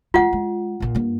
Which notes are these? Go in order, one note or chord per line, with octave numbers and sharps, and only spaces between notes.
E3 G#3 F4 F#5
G#3
A#1 A#2
G2 A#3